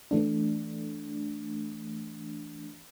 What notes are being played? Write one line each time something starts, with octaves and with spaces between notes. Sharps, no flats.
E3 A3 D4